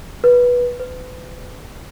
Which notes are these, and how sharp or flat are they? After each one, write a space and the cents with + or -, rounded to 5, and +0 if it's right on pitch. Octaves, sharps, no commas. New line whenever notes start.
B4 -15
B4 +35